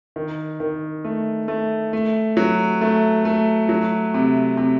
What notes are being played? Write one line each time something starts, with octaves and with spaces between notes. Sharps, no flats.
D#3
D#3
A3
A3
A3
F#3
A3
A3
F#3
C3
C3